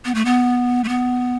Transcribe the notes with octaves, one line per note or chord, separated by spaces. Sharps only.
B3
A3
B3
A3
B3